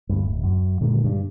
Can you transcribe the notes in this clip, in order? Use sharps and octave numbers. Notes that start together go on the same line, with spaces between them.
D2 G2
D1
F#2
A#2 D3 D#3 G#3
G2